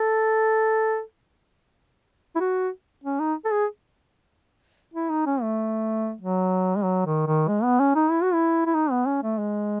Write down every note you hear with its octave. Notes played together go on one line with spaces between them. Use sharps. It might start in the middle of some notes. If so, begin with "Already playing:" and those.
Already playing: A4
E4
F#4
C#4
D#4
A4
G#4
E4
D#4
C#4
A3
F#3
G#3
F#3
D#3
D#3
G#3
B3
C#4
D#4
E4
F#4
E4
E4
D#4
B3
C#4
A3
G#3